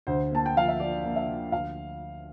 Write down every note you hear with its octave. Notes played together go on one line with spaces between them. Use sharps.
D2 C5
A#3 A5
G5
F3 F5
E5
F3 D5
A#3
E5
F3
D2 F5